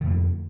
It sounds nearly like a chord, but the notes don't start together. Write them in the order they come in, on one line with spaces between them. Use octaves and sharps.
D#3 F2 A3 D3